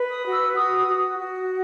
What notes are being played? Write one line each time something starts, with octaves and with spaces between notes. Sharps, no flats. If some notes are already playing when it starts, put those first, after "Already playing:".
Already playing: B4
D#6
F#4
E6
F#4 D#6
F#4
F#4